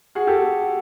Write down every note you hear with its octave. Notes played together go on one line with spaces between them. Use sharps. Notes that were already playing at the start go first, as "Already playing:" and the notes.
F#4 G#4
G4 A4